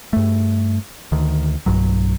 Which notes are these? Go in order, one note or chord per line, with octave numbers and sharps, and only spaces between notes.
G2 A3
D2 D#3
B1 G2 F#3